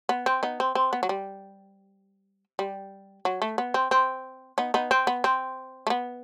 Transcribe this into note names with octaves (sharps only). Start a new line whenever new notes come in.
B3
C4
B3 D#4
C4
C4
B3
F#3
G3
G3
F#3
A3
B3
C4
C4
B3 D#4
B3 D#4
C4
B3
C4
A3
B3